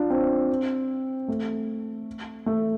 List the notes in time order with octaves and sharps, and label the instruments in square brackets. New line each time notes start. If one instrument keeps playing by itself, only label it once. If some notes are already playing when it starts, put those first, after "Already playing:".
Already playing: [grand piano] D4 F4
C4
A3
A3